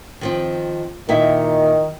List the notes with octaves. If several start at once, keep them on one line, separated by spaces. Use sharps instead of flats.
D#3 F3 C4
A#2 D#3 E4 E5